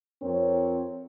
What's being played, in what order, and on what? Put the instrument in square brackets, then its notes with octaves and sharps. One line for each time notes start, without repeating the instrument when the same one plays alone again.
[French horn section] F2 C4 A#4 C#5